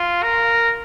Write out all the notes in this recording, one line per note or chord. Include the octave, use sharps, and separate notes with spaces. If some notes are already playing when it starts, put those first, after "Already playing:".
Already playing: F4
A#4